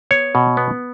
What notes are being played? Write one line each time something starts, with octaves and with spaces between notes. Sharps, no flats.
B3 C#5
B2
B3